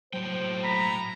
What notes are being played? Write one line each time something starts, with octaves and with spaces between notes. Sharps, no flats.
A2 F#3 C5 G5
A#5 B5